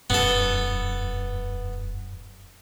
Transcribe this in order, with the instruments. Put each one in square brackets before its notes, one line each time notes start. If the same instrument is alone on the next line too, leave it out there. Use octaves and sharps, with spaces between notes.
[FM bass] E1 [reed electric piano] F#2 [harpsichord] B3 A4